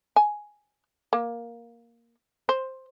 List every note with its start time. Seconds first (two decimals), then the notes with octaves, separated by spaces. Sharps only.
0.16 G#5
1.13 A#3
2.49 C5